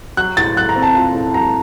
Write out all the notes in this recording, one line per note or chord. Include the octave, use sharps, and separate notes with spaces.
F#3 F#6
A2 A6
F#3 F#6
A#5
C4
A5
F4
A2
F#3 A#5